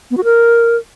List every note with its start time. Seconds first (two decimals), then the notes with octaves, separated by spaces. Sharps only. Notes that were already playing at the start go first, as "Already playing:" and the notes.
0.11 B3
0.17 F#4
0.24 A#4